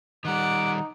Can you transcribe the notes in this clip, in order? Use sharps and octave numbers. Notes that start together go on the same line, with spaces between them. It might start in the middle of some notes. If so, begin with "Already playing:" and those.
D#3 G3 D#4 F#5 D6